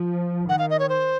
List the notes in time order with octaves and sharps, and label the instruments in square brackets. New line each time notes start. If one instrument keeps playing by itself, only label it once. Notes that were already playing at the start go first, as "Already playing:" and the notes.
Already playing: [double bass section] F3
[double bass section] D#3 [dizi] F#5
[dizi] F5
D#5
C#5
C5